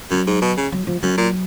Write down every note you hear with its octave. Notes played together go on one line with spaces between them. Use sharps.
F#2 F#3
G#2
B2
C#3
F#3
F3
F#2 F#3
A#2